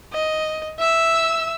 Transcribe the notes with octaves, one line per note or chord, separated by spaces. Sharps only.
D#5
E5 E6